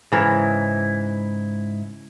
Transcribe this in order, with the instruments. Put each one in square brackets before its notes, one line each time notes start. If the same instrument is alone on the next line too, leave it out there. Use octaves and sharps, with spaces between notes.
[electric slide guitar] G#2 E4 [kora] C#3 E3 A#4